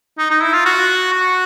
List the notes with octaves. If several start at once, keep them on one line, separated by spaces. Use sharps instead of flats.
D#4
D#4
E4
F4
F#4
F#4